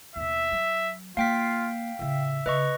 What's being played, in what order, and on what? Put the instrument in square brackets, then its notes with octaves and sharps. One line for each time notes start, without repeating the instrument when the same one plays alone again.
[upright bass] D#2 B2 [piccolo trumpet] E5
[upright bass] F#3
[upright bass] A#3 [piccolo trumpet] F4 [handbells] F5 G5 B6
[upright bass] A2 C#3 [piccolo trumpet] E5
[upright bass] C#3 [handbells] B4 D#5 C#6